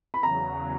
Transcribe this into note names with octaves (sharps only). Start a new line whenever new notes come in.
B5
E2 C#3 F#3 A#5